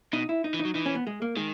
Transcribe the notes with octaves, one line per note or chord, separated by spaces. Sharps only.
B2 D#4
E4
D#4
E3
D#4
F#3
E3 D#4
C#4
B3
G#3
A#3
D#3 G#3